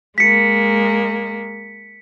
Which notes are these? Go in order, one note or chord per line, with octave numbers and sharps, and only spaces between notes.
G#3 A#3 B6 C#7